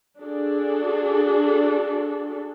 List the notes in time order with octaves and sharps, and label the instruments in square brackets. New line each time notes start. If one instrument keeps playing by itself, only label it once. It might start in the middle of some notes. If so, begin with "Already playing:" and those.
[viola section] D4 F#4 G#4 A4